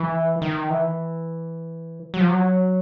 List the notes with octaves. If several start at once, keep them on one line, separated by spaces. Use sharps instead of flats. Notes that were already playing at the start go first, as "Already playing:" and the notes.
Already playing: E3
D#3
E3
F#3
F3
F#3